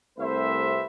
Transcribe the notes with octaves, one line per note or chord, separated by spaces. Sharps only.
C2 C3 A3 B4 C5 E5